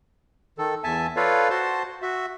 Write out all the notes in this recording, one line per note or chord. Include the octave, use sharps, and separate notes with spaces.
D#3 A4
E2 E5 G#5 A5
F4 A4 B4 C#5 D5 F5
F#4 C5 A5 C6
F#4 E5